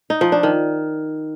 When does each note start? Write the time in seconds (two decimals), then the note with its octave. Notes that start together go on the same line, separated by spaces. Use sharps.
0.10 D#4
0.21 F3
0.32 D4
0.43 D#3